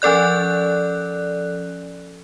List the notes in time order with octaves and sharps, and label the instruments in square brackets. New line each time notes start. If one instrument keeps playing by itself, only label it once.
[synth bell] F3 C#4 A4 D5 F#6